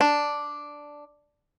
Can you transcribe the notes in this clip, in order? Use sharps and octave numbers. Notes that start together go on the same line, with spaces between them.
D4